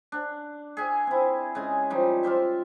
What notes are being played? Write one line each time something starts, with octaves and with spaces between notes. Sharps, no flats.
D4
G#4 E5 G#5
C4 E4
C#3 G#3 G#5
F3 G3 D#4
F4 G4 C5 E5